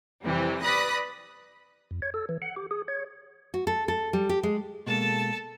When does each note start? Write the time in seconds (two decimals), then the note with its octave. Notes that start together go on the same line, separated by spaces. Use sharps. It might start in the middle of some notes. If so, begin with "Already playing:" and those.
0.24 F2 C3 E3 G3
0.61 B4 D5 B5 D#6 F#6 A#6
1.91 F2
2.02 C#5
2.14 A4
2.29 E3
2.42 F#5
2.56 G4
2.71 G#4
2.88 C#5
3.54 F#4
3.67 A4
3.88 A4
4.13 G3
4.29 G4
4.43 G#3
4.87 B2 G#3 A#3 A4 A5